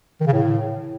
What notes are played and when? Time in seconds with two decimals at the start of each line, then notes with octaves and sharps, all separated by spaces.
0.21 D#3
0.27 C#3
0.33 A2